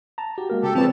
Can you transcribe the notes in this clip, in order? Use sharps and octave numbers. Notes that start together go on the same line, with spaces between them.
A5 A#5
F#4 G4
G#3 A#3 A#4
C#3 G4 A4
A#2 C#3 F3 C4 B4 A5